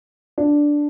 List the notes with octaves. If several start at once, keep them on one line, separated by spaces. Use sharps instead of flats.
D4